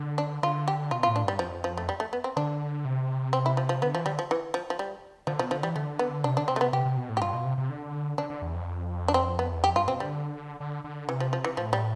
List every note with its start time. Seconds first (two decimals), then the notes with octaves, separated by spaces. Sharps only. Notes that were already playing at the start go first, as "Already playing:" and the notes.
Already playing: D3
0.18 D4
0.43 D3 F4
0.68 G4
0.91 B2 F4
1.03 F4
1.07 A2
1.16 D4
1.24 G2 G3
1.39 F2 F3
1.64 F3
1.77 A3
1.89 G3
2.00 A3
2.13 B3
2.24 C4
2.36 D3 D4
2.85 C3
3.33 C4
3.46 E4
3.57 F3
3.69 F3
3.82 D3 B3
3.94 E3 F3
4.06 D3 G3
4.19 F3
4.31 E3
4.54 F3
4.70 F3
4.79 G3
5.27 D3 F3
5.39 B2 F3
5.51 D3 F3
5.63 E3 G3
5.76 D3 A3
5.99 B3
6.24 C3 D4
6.37 D3 D4
6.48 C3 C4
6.56 A3
6.61 B3
6.73 C3 G4
6.85 C3
6.97 B2
7.09 A2
7.17 G4
7.21 G2 F4
7.33 B2
7.45 C3
7.58 C3
7.69 D3
8.18 D3 D4
8.30 D3
8.42 E2
8.54 F2
9.08 D4
9.14 C4
9.39 B3
9.53 E2
9.63 F2 G4
9.75 G2 F4
9.88 B2 C4
10.00 D3 G3
10.60 D3
10.84 D3
11.08 C3 E3
11.20 F3
11.33 F3
11.44 E3
11.57 A2 F3
11.73 G3